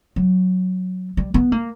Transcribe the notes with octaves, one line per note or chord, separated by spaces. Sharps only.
F#3
G3
B3
A#3